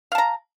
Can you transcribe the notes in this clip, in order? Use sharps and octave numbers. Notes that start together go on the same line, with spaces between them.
F5 A5 A#5